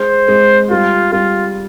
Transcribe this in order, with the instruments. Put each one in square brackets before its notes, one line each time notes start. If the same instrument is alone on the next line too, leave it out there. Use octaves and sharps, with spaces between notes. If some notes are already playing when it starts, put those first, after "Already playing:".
Already playing: [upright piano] G#3 [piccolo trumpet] C5
[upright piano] G#3
[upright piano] G3 [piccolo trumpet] F4
[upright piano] G3 [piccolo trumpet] F4